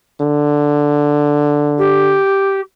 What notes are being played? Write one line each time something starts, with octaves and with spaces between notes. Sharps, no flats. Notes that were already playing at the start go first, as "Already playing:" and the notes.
D3
G4